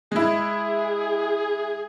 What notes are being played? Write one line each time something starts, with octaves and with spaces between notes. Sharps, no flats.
G#3 E4 G#4